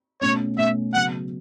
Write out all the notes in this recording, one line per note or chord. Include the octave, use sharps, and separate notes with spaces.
B2 A3 C#4 C#5
B2 A3 C#4 E5
C#3 F#3 B3 F#5